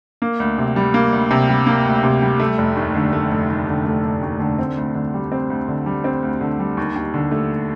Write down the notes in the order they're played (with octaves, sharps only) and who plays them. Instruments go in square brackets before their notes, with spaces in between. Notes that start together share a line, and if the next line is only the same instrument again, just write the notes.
[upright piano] A#3
D2
C3
G3
A#3
D2
C3
G3
A#3
D2
C3
G3
A3
F1
D#2
D3
A3
F1
D#2
D3
A3
F1
D#2
D3
C4
D2
D3
G3
C4
D2
D3
G3
C4
D2
D3
G3
D#2
D#2
D3
A3